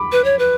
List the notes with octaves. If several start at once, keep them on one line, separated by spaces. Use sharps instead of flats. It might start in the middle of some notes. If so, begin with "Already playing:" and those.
Already playing: B5 D6
B4
C#5
B4